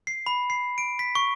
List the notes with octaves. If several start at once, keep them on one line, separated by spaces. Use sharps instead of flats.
C7
B5
C7
D7
B6
C#6